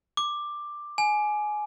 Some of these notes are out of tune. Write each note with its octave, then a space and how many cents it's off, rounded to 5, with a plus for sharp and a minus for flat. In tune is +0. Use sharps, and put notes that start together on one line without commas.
D6 +10
G#5 +20